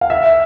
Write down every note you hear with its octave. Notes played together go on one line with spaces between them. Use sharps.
F5
E5